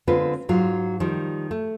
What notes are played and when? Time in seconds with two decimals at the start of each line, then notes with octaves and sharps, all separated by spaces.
0.07 D3 G#3 B3 C4 F4 B4
0.49 G#2 F#3 F4
1.00 D#3 F3 G3
1.51 A3